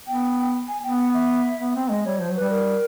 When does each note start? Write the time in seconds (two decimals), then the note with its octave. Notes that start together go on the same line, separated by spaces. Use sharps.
0.07 B3 G5
0.68 G#5
0.83 B3 G5
0.98 F#5
1.14 E5
1.60 B3
1.75 C4
1.90 G#3 D#5
2.05 G3 C#5
2.20 F3 C5
2.30 F#3
2.36 G3 B4
2.50 A#4